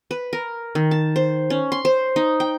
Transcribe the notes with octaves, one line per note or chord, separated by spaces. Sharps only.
B4
A#4
D#3
A5
C5
C#4
C6
C5
D#4
G5